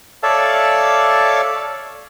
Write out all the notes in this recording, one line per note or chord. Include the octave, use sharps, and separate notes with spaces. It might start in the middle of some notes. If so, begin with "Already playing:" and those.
A4 C#5 D5 E5 F5 A5